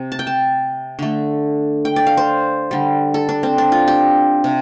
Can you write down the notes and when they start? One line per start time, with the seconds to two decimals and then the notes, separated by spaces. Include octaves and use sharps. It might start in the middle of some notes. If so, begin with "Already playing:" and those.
Already playing: C3
0.12 A5
0.19 G5
0.27 A5
0.99 D3 A3
1.85 G5
1.96 D5
2.07 F5
2.17 C5
2.71 D3 G3
3.14 A4
3.29 D4
3.43 C4
3.58 D4
3.72 F4
3.88 G4
4.44 C3